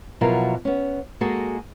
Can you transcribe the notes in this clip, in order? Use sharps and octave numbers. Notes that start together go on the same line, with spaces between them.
B2 F3 F#3 E4 A#4
B3 C#4
G#3 A#3 F#4 G#4 A4